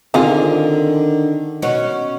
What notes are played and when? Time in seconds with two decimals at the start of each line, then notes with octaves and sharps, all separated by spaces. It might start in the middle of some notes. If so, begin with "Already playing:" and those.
0.14 D3 D#3 C4 F4 G#4 D#5
1.62 B2 C#4 F#5